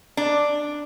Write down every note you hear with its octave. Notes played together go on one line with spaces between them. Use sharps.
D4